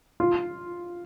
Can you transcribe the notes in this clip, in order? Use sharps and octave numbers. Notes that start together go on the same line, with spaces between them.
F4